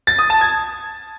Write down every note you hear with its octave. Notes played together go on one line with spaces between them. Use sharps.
A6
D#6
A5
G#6